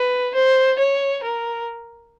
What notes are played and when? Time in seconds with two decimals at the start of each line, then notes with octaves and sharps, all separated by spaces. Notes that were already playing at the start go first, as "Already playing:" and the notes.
Already playing: B4
0.35 C5
0.78 C#5
1.23 A#4